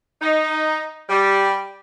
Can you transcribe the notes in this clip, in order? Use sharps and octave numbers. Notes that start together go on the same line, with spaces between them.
D#4
G3